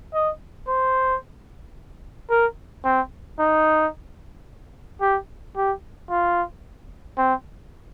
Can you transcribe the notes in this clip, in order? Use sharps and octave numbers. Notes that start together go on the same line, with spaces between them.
D#5
C5
A#4
C4
D#4
G4
G4
F4
C4